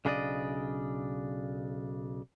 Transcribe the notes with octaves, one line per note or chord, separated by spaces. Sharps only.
B1 C#3 D4 A#4 D5 D#5